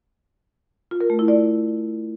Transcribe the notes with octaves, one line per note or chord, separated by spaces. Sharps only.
F4
A#4
A3
E4
D5